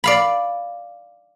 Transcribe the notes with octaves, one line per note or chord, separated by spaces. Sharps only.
D5 F5 B5